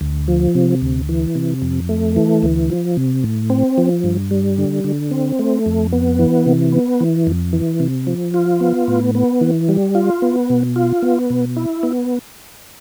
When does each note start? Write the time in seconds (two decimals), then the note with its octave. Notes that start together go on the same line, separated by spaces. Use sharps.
0.01 D2
0.28 F3
0.55 C3
0.82 D2
1.09 E3
1.35 C3
1.62 F2
1.89 A3
2.16 E3
2.43 D2
2.70 F3
2.97 C3
3.24 A2
3.50 C4
3.78 F3
4.04 G2
4.31 G3
4.58 D3
4.84 D3
5.11 C4
5.39 A3
5.66 F2
5.92 B3
6.19 E3
6.46 C3
6.72 B3
7.00 E3
7.27 F2
7.53 E3
7.80 C3
8.07 F3
8.34 F4
8.60 B3
8.88 A2
9.15 B3
9.41 E3
9.69 G3
9.95 F4
10.22 B3
10.50 B2
10.76 F4
11.02 B3
11.30 B2
11.57 E4
11.83 B3